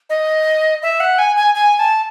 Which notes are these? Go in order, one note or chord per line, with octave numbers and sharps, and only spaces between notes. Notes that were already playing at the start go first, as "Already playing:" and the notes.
D#5
E5
F#5
G#5
G#5
G#5
A5